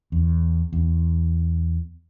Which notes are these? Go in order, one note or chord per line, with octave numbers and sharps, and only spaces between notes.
E2
E2